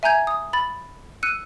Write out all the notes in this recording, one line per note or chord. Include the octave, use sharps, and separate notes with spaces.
E5 G#5 A#5 G6 G#6
D#6
B5 A6
E6 F#6 C#7 D#7